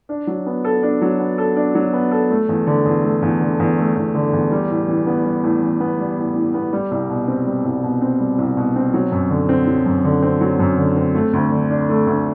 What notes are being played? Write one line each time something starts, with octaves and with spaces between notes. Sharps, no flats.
D4
F#3
B3
A4
D4
F#3
B3
A4
D4
F#3
B3
A4
A3
E2
D3
E2
A3
E2
D3
E2
A3
E2
D3
E2
G3
A2
E3
B3
G3
A2
E3
B3
G3
A2
E3
B3
G3
C2
B2
C4
G3
C2
B2
C4
G3
C2
B2
C4
F#3
F#2
D3
C4
F#3
F#2
D3
C4
F#3
F#2
D3
C4
A3
D2
D3
D4
A3
D2